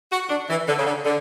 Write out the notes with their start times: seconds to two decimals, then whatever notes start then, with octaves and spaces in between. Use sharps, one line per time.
0.11 F#4
0.29 D4
0.49 E3
0.67 D3
0.78 C#3
0.86 D3
1.05 D3